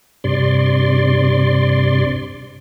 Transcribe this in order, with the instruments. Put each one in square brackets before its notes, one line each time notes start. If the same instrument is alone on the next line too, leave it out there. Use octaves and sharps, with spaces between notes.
[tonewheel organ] G2 C3 D5 C6